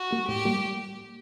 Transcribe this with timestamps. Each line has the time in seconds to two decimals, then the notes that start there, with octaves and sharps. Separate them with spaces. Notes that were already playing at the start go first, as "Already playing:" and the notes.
Already playing: F#4
0.11 G3 A#3
0.28 A2 G4
0.45 G3 A#3